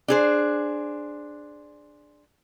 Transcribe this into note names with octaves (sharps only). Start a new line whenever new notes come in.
D4 G#4 C5